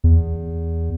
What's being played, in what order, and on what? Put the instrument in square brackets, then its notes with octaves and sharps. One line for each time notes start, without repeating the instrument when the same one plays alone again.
[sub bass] E2